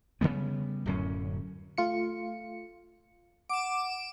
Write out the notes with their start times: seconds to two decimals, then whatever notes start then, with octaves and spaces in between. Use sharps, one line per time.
0.21 C#3 F#3 G3 B3
0.86 D1 F#2 C#4
1.78 A3 F4 C#7
3.49 F#5 D6 D7 E7